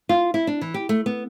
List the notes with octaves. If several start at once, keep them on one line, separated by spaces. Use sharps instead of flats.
F4
E4
D4
E3
G4
A3
B3